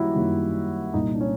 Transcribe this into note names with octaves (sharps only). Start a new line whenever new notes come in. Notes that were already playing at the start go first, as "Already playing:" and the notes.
Already playing: F#2 D#3 G3 A#3 E4 F#4
F#2 D#3 G3 A#3
C2 A#2 G3 A#3 D#4
D4
C#4